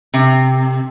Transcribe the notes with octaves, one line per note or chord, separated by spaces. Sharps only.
C3